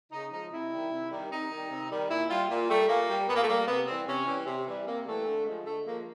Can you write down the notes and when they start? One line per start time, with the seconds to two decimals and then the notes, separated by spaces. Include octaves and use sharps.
0.12 C#3 D#4
0.31 F3 G#3 D#4
0.51 C3 E4
0.72 D#3 G3
0.91 C3
1.11 D#3 G3
1.30 C3 D#4
1.50 D#3 G3
1.70 C3
1.90 D#3 G3
2.09 A#2 E4
2.29 G3 F4
2.50 A#2
2.69 G3 A3
2.88 A#2 A#3
3.09 G3
3.28 A#2 B3
3.35 A#3
3.43 A3
3.48 G3 A#3
3.67 C3 B3
3.87 E3 G3 C4
4.06 C3 C#4
4.26 E3 G3
4.46 C3
4.66 E3 G3
4.86 C3 A#3
5.05 E3 G3 A3
5.25 D3
5.45 F3 G#3
5.65 D3 A3
5.84 F3 G#3 A#3